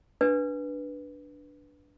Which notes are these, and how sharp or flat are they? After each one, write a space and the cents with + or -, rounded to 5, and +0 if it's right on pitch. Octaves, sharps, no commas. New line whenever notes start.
D4 +0 B4 -10